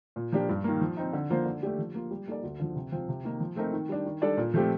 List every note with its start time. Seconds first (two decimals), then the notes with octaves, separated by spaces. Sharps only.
0.16 A#2
0.32 F3 A#3 D4 G4
0.49 G2
0.64 D#3 A#3
0.81 F3
0.97 C4 D#4
1.13 D3
1.30 F3 A#3 F4 C5
1.46 D3
1.63 A3 D4 G4
1.79 F3
1.95 A#3 F4
2.11 G3
2.28 A#3 D#4 A4 D5
2.43 D2
2.59 D3 F3
2.75 C3
2.92 F3 C4 F4
3.09 C3
3.24 D#3 A#3 D#4
3.40 F3
3.56 A3 C4 D#4 A#4
3.73 D#3
3.89 G3 D4
4.06 D#3
4.22 G3 D4 A4 D5
4.37 A#2
4.54 F3 A3 C4 G4